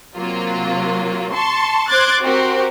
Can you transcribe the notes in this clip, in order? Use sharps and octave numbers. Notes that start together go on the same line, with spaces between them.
C3 F#3 A#3 F4
A5 C6 C#6
C5 C6 D6 F#6 G#6 A6
C4 F#4 G4 A#4